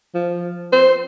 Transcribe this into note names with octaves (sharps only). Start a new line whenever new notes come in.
F3
C5